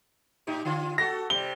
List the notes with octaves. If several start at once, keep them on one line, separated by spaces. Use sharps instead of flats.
A2 D#4 G4
D3 F4
F#4 A4 A#6
C3 G3 G7